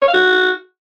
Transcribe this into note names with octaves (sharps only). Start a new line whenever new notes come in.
C#5
F5
F#4